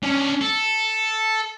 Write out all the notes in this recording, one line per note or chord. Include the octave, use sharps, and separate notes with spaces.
C#4 D4
A4